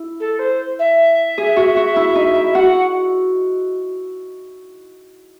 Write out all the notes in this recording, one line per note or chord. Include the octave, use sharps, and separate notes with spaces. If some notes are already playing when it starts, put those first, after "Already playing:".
Already playing: E4
A4
C5
E5
G#4
F#4
F#4
E4
D#4
E4
F#4 F#5